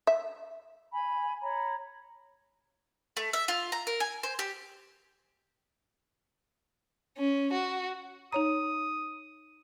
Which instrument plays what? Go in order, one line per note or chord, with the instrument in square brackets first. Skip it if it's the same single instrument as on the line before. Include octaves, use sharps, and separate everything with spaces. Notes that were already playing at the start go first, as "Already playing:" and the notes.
[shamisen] E5
[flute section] G#5 B5
C#5 A#5 B5
[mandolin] A3
E5
F4
A#5
A#4
G#5
C5
G4
[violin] C#4
F#4
[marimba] D#4 C#5 A#5 [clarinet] D#6